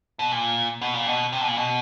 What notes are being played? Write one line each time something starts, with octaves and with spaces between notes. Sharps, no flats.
B2
A#2
B2
A#2
B2
C3
B2
A#2
B2